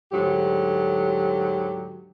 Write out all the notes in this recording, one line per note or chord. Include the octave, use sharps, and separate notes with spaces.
D2 G#2 D3 F#3 G4